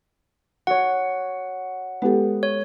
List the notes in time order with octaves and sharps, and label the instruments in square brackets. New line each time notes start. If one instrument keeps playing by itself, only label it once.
[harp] F#4 C#5 [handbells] F#5
[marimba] G#3 A4 [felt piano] B3 G4
[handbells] C#5